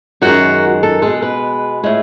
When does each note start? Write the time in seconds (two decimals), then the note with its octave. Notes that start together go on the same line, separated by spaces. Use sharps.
0.22 F#2 D#3 G#3 F#4
0.83 A4
1.02 B2 G#3 A4
1.22 B4
1.84 A2 G#3